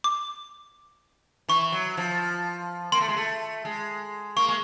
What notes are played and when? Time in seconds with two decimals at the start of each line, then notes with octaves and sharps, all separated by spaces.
0.04 D6
1.49 E3 C#6
1.72 F#3
1.97 F3
2.92 A#3 C6
3.01 A3
3.08 G#3
3.17 A3
3.65 G#3
4.36 A#3 C#6
4.48 G#3